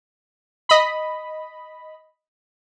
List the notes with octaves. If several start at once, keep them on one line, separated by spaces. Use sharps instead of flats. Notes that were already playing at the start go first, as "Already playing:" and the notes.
D#5 B5